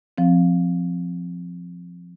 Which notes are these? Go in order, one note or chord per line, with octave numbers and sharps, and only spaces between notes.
F3 C4